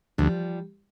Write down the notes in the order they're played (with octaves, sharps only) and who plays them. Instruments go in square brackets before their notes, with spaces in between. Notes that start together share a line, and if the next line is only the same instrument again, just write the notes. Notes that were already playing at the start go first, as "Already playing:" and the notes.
[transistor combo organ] D2 [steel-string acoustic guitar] F3 G3